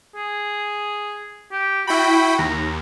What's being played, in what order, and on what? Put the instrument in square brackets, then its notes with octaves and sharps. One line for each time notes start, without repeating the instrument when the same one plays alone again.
[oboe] G#4
G4
[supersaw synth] E4 G5 B5 [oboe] F#4
[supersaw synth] D#2 [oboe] A#5